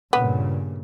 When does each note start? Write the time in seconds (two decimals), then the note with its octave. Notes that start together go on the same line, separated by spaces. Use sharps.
0.13 G2 A#2 C#3 B3